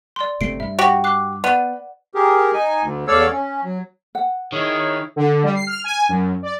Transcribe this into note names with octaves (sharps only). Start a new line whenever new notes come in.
D5 C6
G1 C3 A3 C7 D7
G2 E5
F#4 G4
D6 F#6 C7
B3 D5 F#5 D#7
G4 G#4 A#4
D#4 G#5
D2
E2 A4 C#5 D5 F5 E6
C#4
F#3
F#5
D#3 E4 G#4 C#5
D3
G3
C7
F6
G#5
F#2
D5